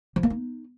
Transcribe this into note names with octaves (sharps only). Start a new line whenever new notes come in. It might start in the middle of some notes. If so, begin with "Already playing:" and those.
F3
A#3
D#4